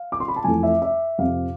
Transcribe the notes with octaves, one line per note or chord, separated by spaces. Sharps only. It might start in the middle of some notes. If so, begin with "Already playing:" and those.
Already playing: F5
D6
C6
B5
A5
F2 E3 A3 G#5
E5
E5
F2 C3 F3 F5